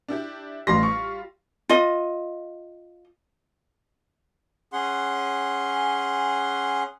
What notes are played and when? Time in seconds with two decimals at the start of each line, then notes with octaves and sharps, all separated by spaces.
0.08 D4 E4 G4
0.67 A1 G3 F4 C6 A#6
0.83 C#6
1.69 F4 D#5
4.73 C#4 G#4 F#5 C6